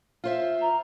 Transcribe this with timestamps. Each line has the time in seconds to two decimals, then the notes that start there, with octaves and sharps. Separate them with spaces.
0.24 F4 C5 E5
0.61 A#5